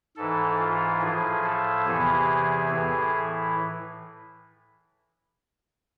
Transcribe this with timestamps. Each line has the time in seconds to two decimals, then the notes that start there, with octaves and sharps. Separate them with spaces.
0.16 G#2 E3 A4
0.59 F4
1.02 A2 F3 G#4
1.44 A4
1.85 E2 C3 E3 G#4
2.71 A2 E3